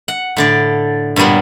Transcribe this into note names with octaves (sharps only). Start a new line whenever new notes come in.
F#5
A2 D3 D5
G2 A#2 F#3 G3 B3